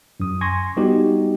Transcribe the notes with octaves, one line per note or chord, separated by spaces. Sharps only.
F#2 D#6
G#5 C6 C#6 G#6 A#6
G3 B3 D#4 F#4 G4